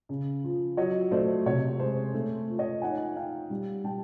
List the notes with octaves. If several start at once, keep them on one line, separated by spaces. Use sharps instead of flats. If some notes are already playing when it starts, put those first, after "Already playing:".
C#3
F3
F#3 C#5 D#5
A3 C5 D5
C3 C#5
G#3 C5
A3
F3
C#5 D#5
D#4 F#5 G#5
D#4 F5 G5
G3
G3 G5 A5